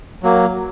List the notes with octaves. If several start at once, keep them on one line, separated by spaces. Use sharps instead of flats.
F#3 A#3